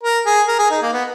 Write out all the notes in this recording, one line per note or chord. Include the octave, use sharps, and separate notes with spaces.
A#4
G#4
A#4
G#4
D#4
A#3
B3